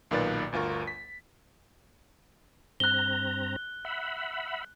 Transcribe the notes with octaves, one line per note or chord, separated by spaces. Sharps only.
B1 A#2 D#3 B4 D5 A6
G1 D2 F4 A#4 C#6
B6
G2 C4 A#5 F#6 G7
E5 F#5 B5